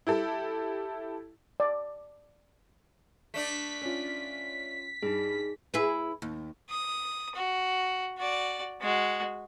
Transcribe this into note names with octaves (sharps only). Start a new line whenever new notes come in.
E4 G4 A4
D5
A3 D4 B6
C#4 F4
G2 D#4 G#4
E4 G#4 B4
D#2
D#6
F#4
F#4 D5
G#3 F#4